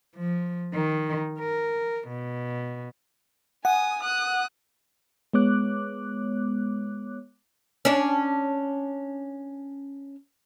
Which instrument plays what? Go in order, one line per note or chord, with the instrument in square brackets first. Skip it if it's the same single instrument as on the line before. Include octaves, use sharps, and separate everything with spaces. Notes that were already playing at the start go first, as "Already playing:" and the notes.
[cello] F3
D#3
A#4
B2
[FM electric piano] F#5 [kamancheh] G#5 D#6
[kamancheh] D#6 F#6
[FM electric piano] G#3 B3 C#5 D6 F#6
[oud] C#4 D4